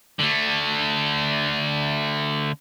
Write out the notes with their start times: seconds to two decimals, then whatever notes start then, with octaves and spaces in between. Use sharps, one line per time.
0.20 D3 A3